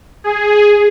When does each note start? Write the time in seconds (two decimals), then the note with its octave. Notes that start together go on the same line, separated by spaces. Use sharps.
0.24 G#4